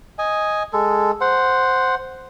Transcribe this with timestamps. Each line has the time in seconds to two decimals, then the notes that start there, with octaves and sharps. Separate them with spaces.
0.19 D#5 G#5
0.73 G#3 A4
1.21 C5 F#5